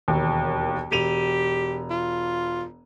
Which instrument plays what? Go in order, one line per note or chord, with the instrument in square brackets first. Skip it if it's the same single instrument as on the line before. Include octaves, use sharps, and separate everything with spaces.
[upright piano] E1 D#2
[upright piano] E1 D#7 F7 [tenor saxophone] G4
[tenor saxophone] F4